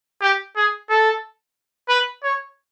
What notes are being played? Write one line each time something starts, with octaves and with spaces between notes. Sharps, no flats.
G4
G#4
A4
B4
C#5